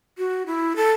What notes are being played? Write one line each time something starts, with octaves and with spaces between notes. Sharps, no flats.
F#4
E4
A4